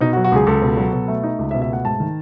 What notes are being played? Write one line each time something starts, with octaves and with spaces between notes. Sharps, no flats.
B2 D#4
F#4
F#3
F#4
C#2 G#4
C#2 A4
B2
F#3
B2
A3
D#4
C#2
E5
B2
E5
A3 F#5
G#2 A5
D#3